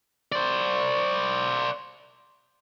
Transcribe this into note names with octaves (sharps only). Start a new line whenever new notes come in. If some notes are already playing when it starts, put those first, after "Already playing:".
C5 D5